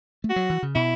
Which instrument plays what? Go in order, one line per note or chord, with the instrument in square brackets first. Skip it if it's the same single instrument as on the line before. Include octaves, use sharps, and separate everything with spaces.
[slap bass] A3
[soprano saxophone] F#4
[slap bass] F#3
E3
C#3
[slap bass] B2 [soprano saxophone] E4